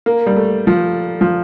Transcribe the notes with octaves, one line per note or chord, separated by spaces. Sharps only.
A#3
G3
A3
F3
F3